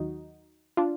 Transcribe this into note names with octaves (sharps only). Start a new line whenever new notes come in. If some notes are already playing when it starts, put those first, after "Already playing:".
Already playing: D#2 D#3 F#3 D#4 F#4
D4 F4